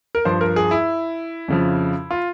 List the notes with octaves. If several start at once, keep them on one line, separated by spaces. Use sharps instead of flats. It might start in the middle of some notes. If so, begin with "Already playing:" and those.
A#4
G2 F3 C5
A#4
G#4
E4
F2 C#3 F3
F4